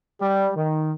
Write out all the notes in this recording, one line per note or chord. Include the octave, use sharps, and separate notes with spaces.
G3
D#3